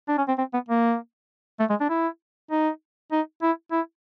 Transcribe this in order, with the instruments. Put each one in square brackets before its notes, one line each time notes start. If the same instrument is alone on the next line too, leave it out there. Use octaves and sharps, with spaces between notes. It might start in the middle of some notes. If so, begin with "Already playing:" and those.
[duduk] D4
C#4
C4
C4
B3
A#3
A3
G#3
D4
E4
D#4
D#4
E4
E4